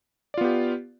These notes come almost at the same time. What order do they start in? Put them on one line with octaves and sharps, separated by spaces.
D5 F4 B3 G4